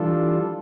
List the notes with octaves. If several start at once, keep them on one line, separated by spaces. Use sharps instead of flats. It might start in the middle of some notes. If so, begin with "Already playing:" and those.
Already playing: E3 G3 D4 F4 A4